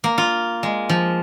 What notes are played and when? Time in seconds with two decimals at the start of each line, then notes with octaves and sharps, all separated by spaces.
0.04 A#3
0.18 F4
0.63 G#3
0.89 F3